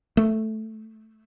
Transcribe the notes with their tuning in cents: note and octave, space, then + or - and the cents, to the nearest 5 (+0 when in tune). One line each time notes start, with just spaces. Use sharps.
A3 -5